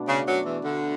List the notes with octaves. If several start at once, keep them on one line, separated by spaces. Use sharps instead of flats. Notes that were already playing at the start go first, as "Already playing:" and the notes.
Already playing: B2 A3 D4
C#3
F#2 F#3
E2 E3
D2 D3